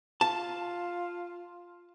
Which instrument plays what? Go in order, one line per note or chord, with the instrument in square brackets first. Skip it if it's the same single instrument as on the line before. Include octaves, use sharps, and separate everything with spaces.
[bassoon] F4 [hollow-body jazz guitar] A5